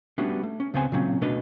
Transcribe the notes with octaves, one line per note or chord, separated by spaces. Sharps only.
G3 A3 B3 C#4 D4 F#4
A3
C#4
C#2 C#3 B3 C4 C5 G#5
A#2 C#3 F#3 C4 C#4
B2 A3 D4 B4 D#5 F5